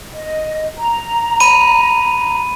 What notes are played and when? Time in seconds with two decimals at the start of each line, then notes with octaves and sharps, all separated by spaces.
0.14 D#5
0.78 A#5
1.40 B5 D#7